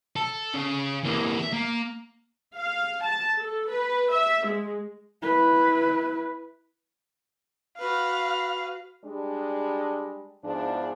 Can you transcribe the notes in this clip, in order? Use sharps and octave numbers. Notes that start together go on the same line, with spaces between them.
A4
C#3
E3 A#3
E5
A#3
F5
A5
A4
B4
E5
G#3
E4 B4
F#4 B4 F5
G3 G#3 D4
E2 G#2 F3 D4